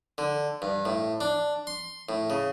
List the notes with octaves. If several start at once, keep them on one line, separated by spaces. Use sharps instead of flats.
D3
G2
A2
D4
C6
A2
C#3